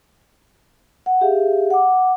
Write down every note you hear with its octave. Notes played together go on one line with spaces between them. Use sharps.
F#5
G4 G#4 E5 F5
F#5 D6